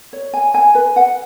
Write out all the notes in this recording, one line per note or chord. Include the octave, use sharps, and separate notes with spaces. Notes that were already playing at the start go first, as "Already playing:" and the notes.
C#5
G#5
G#5
B4
F#5